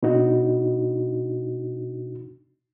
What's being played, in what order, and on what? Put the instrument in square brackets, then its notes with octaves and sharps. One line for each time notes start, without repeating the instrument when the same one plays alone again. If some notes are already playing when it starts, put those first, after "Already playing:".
[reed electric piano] B2 D4 D#4 F#4